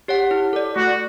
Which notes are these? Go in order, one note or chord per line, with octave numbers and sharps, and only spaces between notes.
G4 C#5 F#5
E4
A4 D5
A3 F#4